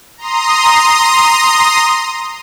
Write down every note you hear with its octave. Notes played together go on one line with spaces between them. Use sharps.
A#5 C6 D#6